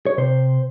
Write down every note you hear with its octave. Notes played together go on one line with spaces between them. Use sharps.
C#5
C3 C5